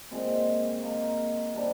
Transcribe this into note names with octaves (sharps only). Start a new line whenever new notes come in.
A#2 G#3 C4
A#3 D#4 A#4
C3 G3 D4